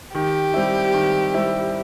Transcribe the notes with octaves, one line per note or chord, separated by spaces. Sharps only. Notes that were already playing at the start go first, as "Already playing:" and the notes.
D#3 G4
G3 C4 E4
D#3
G3 C4 E4